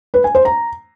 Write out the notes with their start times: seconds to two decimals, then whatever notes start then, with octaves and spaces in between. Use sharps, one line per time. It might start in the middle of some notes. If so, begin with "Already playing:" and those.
0.14 B4
0.24 G#5
0.35 C5
0.45 A#5